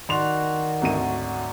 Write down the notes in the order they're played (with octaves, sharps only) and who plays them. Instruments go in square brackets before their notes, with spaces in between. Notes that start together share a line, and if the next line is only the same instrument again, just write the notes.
[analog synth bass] D#3 [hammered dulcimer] F#4 D5 [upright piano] C6 F7
[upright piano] G#1 D2 D#7 [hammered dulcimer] F#3